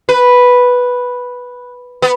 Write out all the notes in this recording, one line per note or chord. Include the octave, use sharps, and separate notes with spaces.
B4
B3